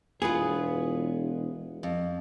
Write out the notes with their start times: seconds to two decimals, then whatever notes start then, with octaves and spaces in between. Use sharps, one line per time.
0.22 E1 B3 F4 G#4 B4
1.83 F2